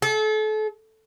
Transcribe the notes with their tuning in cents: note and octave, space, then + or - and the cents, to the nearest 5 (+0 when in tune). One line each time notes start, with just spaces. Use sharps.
A4 -35